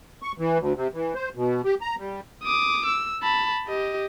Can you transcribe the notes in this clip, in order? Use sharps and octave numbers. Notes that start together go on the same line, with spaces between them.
C#6
E3
D2
C3
E3
C5
B2
G4
A#5
G3
D6 D#6
E6
A5 B5
G4 D#5